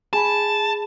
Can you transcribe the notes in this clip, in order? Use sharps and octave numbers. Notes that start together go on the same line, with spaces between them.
G#4 G#5 A5 B5